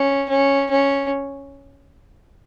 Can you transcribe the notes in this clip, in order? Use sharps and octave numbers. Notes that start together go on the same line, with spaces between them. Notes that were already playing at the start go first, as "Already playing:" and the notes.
Already playing: C#4
C#4
C#4